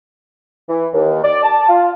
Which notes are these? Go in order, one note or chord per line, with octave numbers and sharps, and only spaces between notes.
E3
D#2
D5
A5
F4